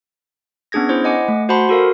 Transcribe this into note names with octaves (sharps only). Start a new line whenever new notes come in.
B3 C#4 D4 G#4 G#6 A#6
E4 C5 C#5
D#5 F#5 G#5 D6
A3
F#4 C5 F#5 A5 B5 C6
F#4 A4 A#4 F5